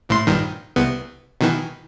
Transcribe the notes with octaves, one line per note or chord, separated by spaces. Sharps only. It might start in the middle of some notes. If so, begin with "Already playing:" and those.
A1 A2 C6
A#1 G2 D#3
C2 B3
B2 D#3 E3